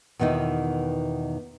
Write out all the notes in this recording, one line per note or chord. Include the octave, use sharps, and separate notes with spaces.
E2 B2 D#3 D#4 E4